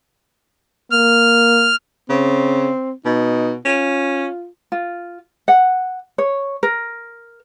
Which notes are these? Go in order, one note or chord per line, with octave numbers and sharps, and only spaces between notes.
A#3 F6
C#3 C4
B2 D#4
C#4 F4
F4
F#5
C#5
A#4